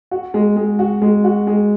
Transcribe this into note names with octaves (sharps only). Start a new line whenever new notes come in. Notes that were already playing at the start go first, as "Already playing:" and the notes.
F#4
G#3
G#3
F#4
G#3
F#4
G#3